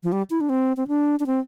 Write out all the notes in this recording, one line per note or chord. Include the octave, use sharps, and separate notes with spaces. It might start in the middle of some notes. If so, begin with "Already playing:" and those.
F3
G3
E4
D4
C4
C4
D4
D4
C4